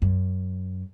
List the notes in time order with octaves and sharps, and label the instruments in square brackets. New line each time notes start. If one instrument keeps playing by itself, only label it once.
[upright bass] F#2